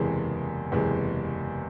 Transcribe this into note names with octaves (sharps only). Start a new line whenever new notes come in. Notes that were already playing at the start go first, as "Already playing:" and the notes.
Already playing: F#1 E2 C3 E3 G#3
F#1 E2 C3 E3 G#3